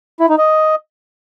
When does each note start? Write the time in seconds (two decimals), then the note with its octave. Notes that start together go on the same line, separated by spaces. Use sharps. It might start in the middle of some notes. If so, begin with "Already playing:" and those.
0.20 E4
0.29 D#4
0.38 D#5